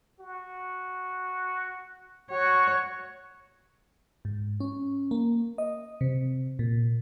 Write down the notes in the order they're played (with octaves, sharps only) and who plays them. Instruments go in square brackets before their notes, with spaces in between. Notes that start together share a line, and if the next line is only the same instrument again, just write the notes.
[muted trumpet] F#4
[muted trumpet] F#4 [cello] C#5
[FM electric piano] G#2
C#4
A#3
D#5
C3
A#2